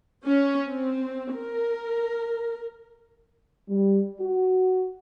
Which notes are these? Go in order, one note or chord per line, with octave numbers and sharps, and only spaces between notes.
C#4
C4
A#4
G3
F#4